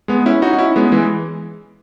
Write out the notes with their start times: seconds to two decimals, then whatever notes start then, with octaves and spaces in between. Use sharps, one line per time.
0.08 G#3 B3
0.26 C#4 E4
0.42 D#4 F#4
0.53 F#4
0.59 C#4 E4
0.76 G#3 B3
0.92 E3 G#3